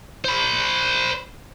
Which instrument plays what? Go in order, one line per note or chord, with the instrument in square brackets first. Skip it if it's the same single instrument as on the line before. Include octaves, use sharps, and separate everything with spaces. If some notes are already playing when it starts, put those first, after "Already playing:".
[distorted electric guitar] C5 B5